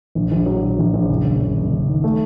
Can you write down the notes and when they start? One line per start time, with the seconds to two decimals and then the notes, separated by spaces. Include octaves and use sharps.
0.15 A#1
0.31 A#1
0.46 F#3
0.62 F#3
0.79 A#1
0.93 A#1
1.09 F#1
1.25 F#1
1.41 F#1
1.56 F#1
1.72 F#1
1.88 D#3
2.04 A3